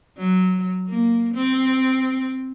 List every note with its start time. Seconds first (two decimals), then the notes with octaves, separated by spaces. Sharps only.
0.17 F#3
0.88 A#3
1.34 C4